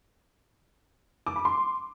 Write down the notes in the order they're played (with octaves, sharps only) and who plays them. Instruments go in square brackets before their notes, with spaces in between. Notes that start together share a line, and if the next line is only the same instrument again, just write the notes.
[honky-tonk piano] D6
B5
C6